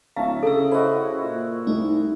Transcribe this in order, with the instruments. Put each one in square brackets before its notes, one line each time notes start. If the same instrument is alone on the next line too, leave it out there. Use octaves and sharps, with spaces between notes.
[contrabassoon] D1 [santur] C#4 [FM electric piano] E5 A5 A#5 [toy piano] F5
[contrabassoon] C#3 [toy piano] A4 E6
[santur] E4 F#4 [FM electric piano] C5 D#5
[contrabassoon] A#2
[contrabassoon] C2 [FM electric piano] A3 D#4